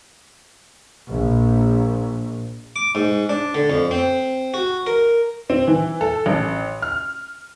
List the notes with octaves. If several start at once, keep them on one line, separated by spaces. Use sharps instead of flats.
A#1
D6
G#2
D4
D3
F2
C4
F#4
A#4
C4
E3
A4
A1
F6